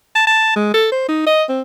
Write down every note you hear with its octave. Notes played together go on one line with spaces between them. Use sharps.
A5
A5
G#3
A4
C5
D#4
D#5
C4